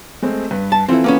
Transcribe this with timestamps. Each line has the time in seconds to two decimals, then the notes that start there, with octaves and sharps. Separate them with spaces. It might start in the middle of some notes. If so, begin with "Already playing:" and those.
0.22 G#3 A3 C4
0.51 G2 B4
0.72 A5
0.89 E3 C4 E4 F4 A4
1.04 A#3 B3 C#4